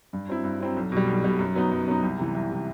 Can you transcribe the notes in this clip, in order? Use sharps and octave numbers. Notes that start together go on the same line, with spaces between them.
G2
F#3 C4 E4
G2
F#3 C4 E4
B1
B2 G3
B1
B2 G3
F#2
F#3 B3 D#4
F#2
F#3 B3 D#4
C2
C3 E3
C2
C3 E3